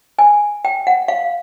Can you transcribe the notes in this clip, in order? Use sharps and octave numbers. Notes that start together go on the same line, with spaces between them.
G#5
G5
F#5
F5